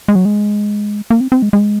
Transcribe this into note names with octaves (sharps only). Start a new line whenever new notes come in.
G#3
F#3
G#3
A#3
C4
C4
G#3
G#3